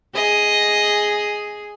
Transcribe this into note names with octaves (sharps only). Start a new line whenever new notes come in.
G#4 D#5